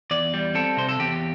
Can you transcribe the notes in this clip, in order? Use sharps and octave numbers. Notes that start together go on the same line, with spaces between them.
E2 D5
G3
C4 A4
C3 C5
A4
E2 G4